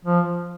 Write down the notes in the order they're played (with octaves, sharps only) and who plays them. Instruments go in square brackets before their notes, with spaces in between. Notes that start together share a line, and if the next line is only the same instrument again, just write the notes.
[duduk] F3